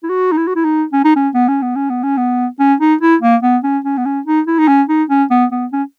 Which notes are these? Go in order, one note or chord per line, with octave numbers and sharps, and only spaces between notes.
E4
F#4
D#4
E4
F#4
E4
D#4
C#4
D#4
C#4
B3
C#4
B3
C#4
B3
C#4
B3
C#4
D#4
E4
A#3
B3
C#4
C#4
B3
C#4
D#4
E4
D#4
C#4
D#4
C#4
B3
B3
C#4